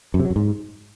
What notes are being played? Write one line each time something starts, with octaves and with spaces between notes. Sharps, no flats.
F#2
C3
F#3
F#2
G#2